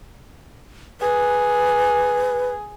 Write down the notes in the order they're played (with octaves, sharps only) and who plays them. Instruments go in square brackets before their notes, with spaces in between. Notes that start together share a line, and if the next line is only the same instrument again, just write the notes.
[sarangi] G#4 [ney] B4